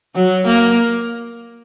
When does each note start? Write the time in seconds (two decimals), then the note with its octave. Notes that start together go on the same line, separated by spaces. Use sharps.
0.15 F#3
0.47 A#3